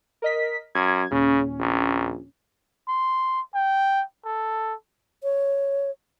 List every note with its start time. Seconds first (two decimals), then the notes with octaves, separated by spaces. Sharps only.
0.22 A#4 D#5 B6
0.75 F#2 G#6
1.11 D#2 A#2 C#3 C#4
1.59 A#1
2.88 C6
3.55 G5
4.25 A4
5.23 C#5